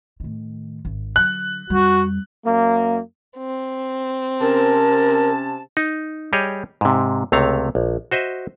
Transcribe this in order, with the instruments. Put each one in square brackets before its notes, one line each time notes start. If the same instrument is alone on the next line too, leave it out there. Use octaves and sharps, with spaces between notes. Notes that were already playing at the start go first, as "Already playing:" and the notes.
[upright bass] A2 D#3
G#1
[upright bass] D3 F#3 [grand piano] F#6
[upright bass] F2 G3 [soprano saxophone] F#4
[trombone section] F#2 A#3
[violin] C4
[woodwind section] C3 C#4 A5 [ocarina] A#4
[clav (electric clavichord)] D#4
G3 G4 G#4 C#5 D#5
G#2 C3
C#2 C3 A3 C#5 F5 A#5
A#1
F#4 C5 D#5 E5